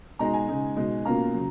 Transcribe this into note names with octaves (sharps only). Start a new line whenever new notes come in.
B2 G#3 D#4 A#5
G#5
C#3 G#3 D#4
B2 G#3 D#4
B2 A#3 C#4 F4 A#5
C#3 F#3